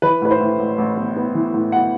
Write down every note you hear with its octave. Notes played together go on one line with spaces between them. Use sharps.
E3 B4
A2 B4
C5
A2
A1
A1
B3
B3
E3
A2
B3 F#5